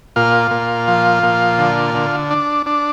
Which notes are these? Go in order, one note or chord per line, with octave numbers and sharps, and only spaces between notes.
A#2 F4
A#2
F3
A#2
D3
D3
D4
D4